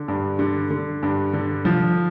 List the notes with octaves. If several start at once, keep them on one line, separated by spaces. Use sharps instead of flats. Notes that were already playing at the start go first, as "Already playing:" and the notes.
Already playing: D3
G2
D3
D3
G2
D3
F3